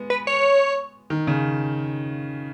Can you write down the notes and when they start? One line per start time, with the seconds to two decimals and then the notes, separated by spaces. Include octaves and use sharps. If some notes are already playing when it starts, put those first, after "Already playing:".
Already playing: G#3 B3
0.10 B4
0.27 C#5
1.10 D#3
1.27 C#3